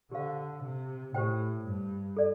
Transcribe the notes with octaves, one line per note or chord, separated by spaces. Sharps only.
D3 G4 C5 F5
C3
A2 G4 C5 G5
G2
A4 D5